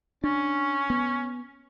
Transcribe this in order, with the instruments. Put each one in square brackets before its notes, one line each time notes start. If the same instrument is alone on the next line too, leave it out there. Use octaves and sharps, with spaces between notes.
[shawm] C#4 [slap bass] D4
[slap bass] B3